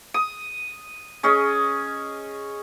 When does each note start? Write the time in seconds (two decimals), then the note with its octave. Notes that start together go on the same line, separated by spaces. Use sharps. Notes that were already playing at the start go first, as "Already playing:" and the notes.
0.14 D#6
1.23 C#4 G#4 C#5 D#5